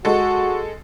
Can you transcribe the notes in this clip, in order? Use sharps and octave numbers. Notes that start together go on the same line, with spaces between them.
G#3 F#4 A4